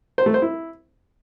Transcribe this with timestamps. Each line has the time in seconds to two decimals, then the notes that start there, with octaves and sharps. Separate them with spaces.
0.18 C5
0.26 A3
0.34 C5
0.42 E4